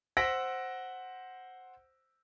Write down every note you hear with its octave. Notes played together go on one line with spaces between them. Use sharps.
C5 F#5 E6 A#6 B6 D7